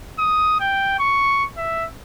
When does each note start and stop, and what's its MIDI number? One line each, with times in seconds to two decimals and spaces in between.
0.18 0.57 87
0.60 0.97 79
0.99 1.45 85
1.57 1.86 76